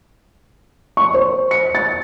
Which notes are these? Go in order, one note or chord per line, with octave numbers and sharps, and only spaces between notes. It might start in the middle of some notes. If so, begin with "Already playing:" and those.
C#6
C5
C#7
A6